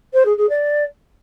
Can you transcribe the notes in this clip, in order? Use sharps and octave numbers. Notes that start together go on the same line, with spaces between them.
C5
G#4
G#4
D5